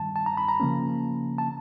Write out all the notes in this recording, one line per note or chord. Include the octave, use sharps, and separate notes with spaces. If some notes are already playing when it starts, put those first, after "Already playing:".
Already playing: G2 D#3 G3 A5
A5
A#5
B5
A#5
C#3 F3 A#3 C#4
A5